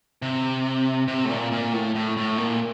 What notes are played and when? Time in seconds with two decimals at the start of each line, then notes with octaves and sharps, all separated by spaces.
0.22 C3
1.08 C3
1.25 A2
1.30 A#2
1.52 A#2
1.73 A2
1.95 A2
2.17 A2
2.38 A#2